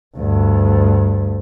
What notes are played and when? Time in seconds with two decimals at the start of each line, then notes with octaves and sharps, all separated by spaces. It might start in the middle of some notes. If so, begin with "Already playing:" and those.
0.17 D2 G2